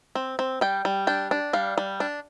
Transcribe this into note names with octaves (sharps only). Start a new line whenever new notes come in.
C4
C4
G3 G5
G3
D4 G5
D4
G3 F5
G3
D4